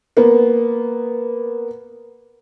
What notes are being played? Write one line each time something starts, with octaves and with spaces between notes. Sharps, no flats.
A#3 B3